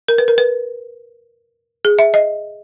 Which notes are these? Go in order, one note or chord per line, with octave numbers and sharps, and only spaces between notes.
A#4
B4
A#4
B4
G#4
E5
D#5